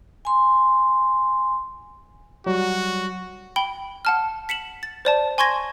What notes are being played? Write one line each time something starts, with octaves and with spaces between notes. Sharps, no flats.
G#5 C6
F#3 G3 F#4
G5 B5 G7
F#5 A5 F6
B6 C#7 E7 F#7
A6
C5 D5 A5
G#5 C6 C#6 G#6 A#6